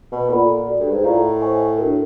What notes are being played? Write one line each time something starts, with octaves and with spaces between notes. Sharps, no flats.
B2
A#2 F4 A4 D5 F#5 B5
F#4 A4 D5
G2
G#2
A2 F4 A#4 D5 F5 A#5
C5 D#5 G#5 C#6
D4 F#4 A#4